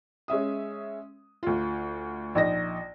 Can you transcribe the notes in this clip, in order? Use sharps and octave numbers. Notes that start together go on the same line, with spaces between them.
G#3 C#4 E5 D#6
D2 F4
A#1 D#4 A#6